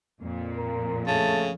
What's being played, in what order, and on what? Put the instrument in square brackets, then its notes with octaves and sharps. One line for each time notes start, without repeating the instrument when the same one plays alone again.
[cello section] F2 A#2
[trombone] A#4
[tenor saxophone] C#3 [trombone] A3 [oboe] A5